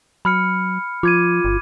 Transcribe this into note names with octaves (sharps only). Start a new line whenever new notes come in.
F#3 B5 F6 C#7
F3 F4 D6 G#6 D#7
G1